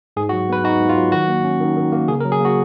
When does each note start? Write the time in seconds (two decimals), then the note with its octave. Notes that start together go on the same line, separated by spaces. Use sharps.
0.17 G#2 G#4
0.29 F#4
0.33 F#3
0.49 B3 B4
0.64 D#4 F#4
0.80 G#2
0.89 F4
0.97 F#3
1.12 D#3 F#4
1.28 A#3
1.44 C#4
1.60 D#3
1.76 D#3
1.92 A#3
2.08 C#3 G#4
2.20 A#4
2.25 F#3
2.32 G#4
2.40 A#3 F#4